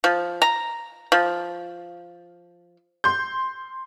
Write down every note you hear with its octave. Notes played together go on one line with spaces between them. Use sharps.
F3
A#5
F3
C6 G6